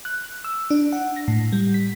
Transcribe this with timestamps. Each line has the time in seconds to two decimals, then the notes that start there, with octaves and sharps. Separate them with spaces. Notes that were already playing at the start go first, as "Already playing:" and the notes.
0.05 F#6
0.44 E6
0.70 D4
0.93 F#5
1.16 A#6
1.28 A2
1.52 G3
1.74 B6